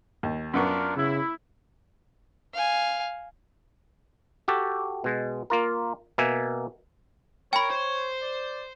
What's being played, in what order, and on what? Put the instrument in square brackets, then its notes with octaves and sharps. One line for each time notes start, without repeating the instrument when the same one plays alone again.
[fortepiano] D#2
[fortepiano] F#2 B3 C#6 [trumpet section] D4 F4 A#4
[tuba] C#3 [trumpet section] E4
[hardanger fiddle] F5 G#5
[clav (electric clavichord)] F#4 G4 A4
B2 G#3
A#3 F4 A#4
B2 A#3 E5 G#5
[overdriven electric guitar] A#4 [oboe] C#5 [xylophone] G5 B5
[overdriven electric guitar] C5
[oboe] D5